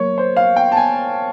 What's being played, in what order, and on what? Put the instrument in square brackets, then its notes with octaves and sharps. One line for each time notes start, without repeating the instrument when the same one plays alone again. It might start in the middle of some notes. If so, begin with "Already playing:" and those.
Already playing: [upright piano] F#3 A#3 [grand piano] C#5
[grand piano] C5
F5
G5
A5
G#5